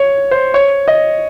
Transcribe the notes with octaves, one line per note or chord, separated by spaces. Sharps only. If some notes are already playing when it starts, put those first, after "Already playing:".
Already playing: C#5
C5
C#5
D#5